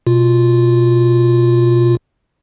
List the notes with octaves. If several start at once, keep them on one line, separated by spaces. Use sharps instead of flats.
B2 F4